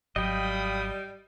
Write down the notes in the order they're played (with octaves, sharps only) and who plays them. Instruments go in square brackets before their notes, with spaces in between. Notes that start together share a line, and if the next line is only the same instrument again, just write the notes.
[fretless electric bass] G#1 F#3 [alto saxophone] G3 [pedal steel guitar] D#5 G5 [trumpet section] F5 B5 D#6